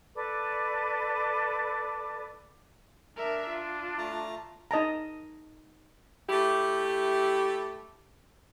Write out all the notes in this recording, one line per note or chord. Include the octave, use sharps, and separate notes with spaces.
A4 B4 D5 D6
D4 A#4 E5
F4
A3 A5 A#5
D#4 D#5 A5 A#5
A3 E4 G4